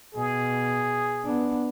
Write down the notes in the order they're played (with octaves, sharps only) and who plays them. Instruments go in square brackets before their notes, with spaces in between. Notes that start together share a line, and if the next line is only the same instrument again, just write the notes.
[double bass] B2 [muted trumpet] G#4
[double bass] B3 D4